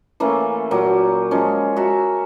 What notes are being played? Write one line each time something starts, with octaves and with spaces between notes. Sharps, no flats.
E3 A3 A#3 C#4
A#2 F#3 G4
F3 G#3 C#4
F#4 E5 A#5